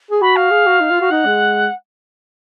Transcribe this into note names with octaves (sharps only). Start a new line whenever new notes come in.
G#4
F#4 B5
F5
G#4
F#4
D#4
F4
F#4
D#4 F#5
G#3